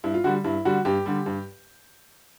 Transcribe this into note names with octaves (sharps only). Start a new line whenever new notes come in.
G2 E4
F4
D3 G3 F#4
G2 E4
D3 G3 F#4
G2 G4
D3 G3
G2